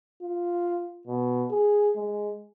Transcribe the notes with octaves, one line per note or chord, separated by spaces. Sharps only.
F4
B2
G#4
G#3